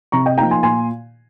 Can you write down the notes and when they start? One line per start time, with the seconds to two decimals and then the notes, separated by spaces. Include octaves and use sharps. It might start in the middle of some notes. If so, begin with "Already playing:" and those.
0.12 C3 A#5 C#6
0.26 D#5 G5
0.38 F3 A#3 D#4 G5 A#5
0.51 G#5 C6
0.63 A#2 G#5 C6